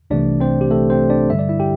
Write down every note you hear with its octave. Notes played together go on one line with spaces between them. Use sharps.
C2 C3 E3 A3 D4 D5
C4 C5
G4
A3 A4
C4 C5
D4 D5
G2 D3 G3 E5
D5
E4 E5
G4 G5